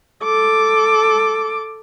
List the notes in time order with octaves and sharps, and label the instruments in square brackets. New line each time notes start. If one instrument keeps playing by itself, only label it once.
[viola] A4 D6